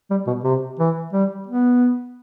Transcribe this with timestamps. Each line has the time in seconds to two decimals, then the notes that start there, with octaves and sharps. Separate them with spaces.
0.10 G3
0.27 B2
0.44 C3
0.79 E3
1.13 G3
1.47 B3